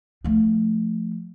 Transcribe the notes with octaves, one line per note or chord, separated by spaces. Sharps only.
F3 A3